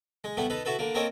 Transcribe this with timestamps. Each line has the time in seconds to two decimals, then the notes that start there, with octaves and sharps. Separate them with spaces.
0.24 G#3
0.37 G3 A3 B3 E4
0.50 D#4 A4 B4
0.65 E4 F#4 A4 B4
0.79 D3 A#3
0.95 A#3 C4 A4 C#5 D#5